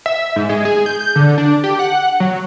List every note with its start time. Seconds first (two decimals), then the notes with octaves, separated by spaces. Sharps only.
0.06 E5
0.36 G#2
0.49 G#3
0.65 G#4
0.86 G6
1.01 G6
1.16 D3
1.38 D4
1.64 G4
1.79 F#5
2.20 F#3